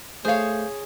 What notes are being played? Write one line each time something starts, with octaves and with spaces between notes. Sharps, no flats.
A3 G#4 C5 C#5 F5